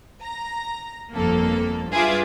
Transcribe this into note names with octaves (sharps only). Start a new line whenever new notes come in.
A#5
G1 F2 A#3 A4
G2 F4 G#4 B4 E5 D6